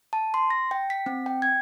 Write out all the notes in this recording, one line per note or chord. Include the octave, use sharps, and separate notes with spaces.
A5
C6
A#6
G5
B6
C4
G5
G#6